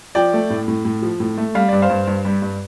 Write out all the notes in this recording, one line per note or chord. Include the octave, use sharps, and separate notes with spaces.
F3 D5 G5
A3
A2
A2
A2
F3
A2
A3
G3 F5
G2 D5
C5 F5
G2
G2
G3
G2